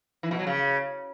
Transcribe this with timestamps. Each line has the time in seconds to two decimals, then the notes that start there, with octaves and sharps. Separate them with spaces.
0.23 E3
0.31 B2
0.39 F#3
0.47 C#3